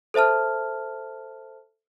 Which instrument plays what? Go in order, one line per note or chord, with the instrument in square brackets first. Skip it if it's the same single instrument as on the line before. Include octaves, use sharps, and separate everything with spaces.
[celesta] A4 C5 E5 A5 F6